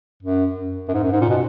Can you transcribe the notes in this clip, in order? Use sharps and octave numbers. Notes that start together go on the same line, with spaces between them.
F#2
F#2
G#2
F#2
G#2
A#2
B2